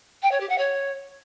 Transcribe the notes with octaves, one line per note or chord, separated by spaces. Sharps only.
G5
C#5
G4
F#5
C#5